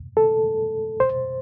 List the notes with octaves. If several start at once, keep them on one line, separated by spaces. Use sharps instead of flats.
A4
C5